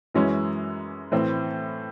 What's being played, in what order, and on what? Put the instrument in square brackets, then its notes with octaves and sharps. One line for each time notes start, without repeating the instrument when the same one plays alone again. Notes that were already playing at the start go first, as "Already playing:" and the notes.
[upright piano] F#2 E3 G#3 C#4 F#4
A2 E3 C4